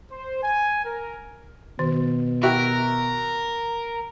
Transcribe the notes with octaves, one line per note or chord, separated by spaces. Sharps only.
C5
G#5
A#4
B2 D#3
E4 F#4 G4 A#4